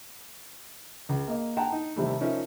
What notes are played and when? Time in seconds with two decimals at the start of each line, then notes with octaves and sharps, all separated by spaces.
1.09 C#2
1.28 A#3 D#5
1.57 F#5 G5 A5 A#5
1.72 D#4
1.96 D#2 C3 G3 A3
2.21 F3 C#4 D#4 A#4 E5